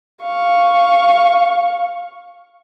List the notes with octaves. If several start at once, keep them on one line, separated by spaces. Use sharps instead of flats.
F5 C#6